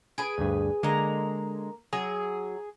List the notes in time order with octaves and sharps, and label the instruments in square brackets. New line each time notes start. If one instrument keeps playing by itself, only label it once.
[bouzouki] G#4 B4 G#5 [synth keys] D7
[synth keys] D2 G2
[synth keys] D3 G#3 [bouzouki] A#3 A#5
[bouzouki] F#3 [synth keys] G#4